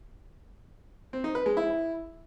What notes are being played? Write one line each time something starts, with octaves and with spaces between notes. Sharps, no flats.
C4
D#4
B4
G#3
E4